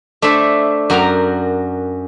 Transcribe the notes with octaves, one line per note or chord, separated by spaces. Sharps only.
A3 D4 A4 C5 E5
F#2 F#4 A#4 G5 A#5